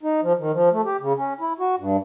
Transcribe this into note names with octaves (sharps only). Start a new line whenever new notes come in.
D#4
F3
D#3
F3
A3
G4
C#3
C#4
E4
F#4
G2